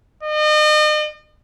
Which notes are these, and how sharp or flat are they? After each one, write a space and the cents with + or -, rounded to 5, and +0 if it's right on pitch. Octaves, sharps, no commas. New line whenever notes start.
D#5 -40